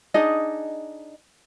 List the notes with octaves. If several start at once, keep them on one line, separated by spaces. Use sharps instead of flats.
D4 D#4 G#4 D#5